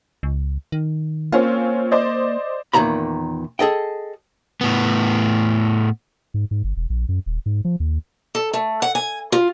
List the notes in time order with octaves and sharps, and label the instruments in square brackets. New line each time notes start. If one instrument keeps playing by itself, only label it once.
[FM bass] C#2
D#3
[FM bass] A#3 [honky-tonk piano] C4 C#4 F4
[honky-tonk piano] C5 D5 D#5
[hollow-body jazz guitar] E2 A#2 D#3 A#5 B5
G#4 A4 D#5 G5
[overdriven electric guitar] A2 B3
[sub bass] G#2
G#2
G1
E1
A#1
F#2
D#1
G#2
F3
D#2
[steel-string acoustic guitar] A4
A3
F#5
G#5
F4